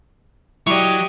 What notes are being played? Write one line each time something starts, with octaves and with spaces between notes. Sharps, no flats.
F#3 E4 G4 D5 D#5 C#6